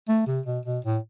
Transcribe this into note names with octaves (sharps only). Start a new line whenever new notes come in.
A3
C3
B2
B2
A2